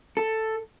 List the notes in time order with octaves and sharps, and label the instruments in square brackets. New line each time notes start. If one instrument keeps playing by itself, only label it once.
[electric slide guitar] A4